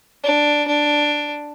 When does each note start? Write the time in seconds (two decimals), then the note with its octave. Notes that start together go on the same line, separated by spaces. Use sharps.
0.24 D4
0.67 D4